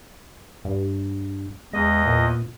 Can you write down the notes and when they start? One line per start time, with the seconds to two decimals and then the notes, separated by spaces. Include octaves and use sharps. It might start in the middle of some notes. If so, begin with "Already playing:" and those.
0.65 G2
1.73 E2 G#3 D#5
2.06 A#2